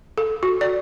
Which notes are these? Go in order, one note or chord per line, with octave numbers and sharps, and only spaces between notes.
A4
F#4
D5